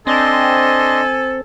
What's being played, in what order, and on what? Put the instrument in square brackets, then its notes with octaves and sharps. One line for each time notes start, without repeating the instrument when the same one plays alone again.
[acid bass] C4 [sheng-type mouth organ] D4 D#5 C6 [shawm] A4 [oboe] G#5